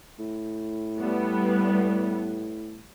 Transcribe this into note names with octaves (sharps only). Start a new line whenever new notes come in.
A2
G3 A3 B3